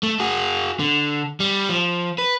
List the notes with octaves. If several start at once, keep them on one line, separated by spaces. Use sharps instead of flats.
A3
F#4 G#4
D3
G3
F3
B4